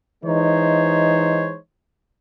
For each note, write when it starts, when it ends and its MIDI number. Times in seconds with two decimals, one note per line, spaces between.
0.24 1.56 52
0.24 1.56 56
0.24 1.56 63
0.24 1.56 72
0.24 1.56 73